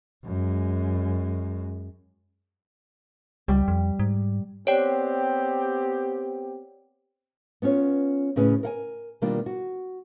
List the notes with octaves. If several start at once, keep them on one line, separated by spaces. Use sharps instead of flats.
F#2 G#3
C#2 G3
F2
G#2
B3 C4 G4 C#5 D5 G5
B3 C#4 F4 C#5
A2 C#3 C#4 G#4 B4
A#4 F#5 G#5
B2 D#3 G3 A#3 D4 F4
F#4